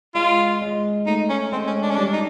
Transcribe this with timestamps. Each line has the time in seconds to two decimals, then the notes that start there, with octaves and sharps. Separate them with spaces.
0.15 G#3 F4
0.61 G#3
1.06 A3 D#4
1.30 C#4
1.52 G#3 C4
1.67 C#4
1.83 D4
1.91 C#4
1.97 G3 D4
2.13 D#4